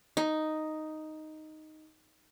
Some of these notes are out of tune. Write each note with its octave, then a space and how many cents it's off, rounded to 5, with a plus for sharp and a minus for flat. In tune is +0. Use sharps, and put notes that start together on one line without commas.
D#4 +0